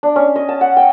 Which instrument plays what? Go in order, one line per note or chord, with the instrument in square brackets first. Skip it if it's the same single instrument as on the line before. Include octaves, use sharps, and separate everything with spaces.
[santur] D4
C#4
D#5
A5
F#5
G5